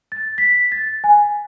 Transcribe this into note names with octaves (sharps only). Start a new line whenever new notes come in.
A6
B6
A6
G#5